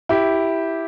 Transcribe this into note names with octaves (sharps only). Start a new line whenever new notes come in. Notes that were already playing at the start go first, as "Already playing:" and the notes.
E4 G4